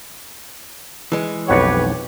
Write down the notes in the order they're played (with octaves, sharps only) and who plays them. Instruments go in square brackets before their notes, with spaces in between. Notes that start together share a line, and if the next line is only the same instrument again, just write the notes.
[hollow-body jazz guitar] E3 G#3
[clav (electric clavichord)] B1 F2 F#5 [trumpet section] G4 B4 C#5